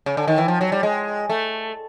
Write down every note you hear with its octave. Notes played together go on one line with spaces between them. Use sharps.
C#3
D3
D#3
E3
F3
F#3
G3
G#3
A3